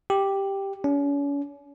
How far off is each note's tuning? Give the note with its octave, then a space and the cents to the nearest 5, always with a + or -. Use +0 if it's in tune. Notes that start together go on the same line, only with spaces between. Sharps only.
G4 +0
C#4 +40